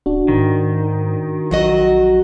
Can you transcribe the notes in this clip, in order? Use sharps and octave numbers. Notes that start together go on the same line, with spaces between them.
D1 D4 F#4
G#2 D#3
A#1 F#3 F#4 D#5